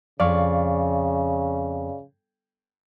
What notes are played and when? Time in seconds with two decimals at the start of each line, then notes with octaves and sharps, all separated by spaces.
0.20 F2 C#3 D5 F5 C#6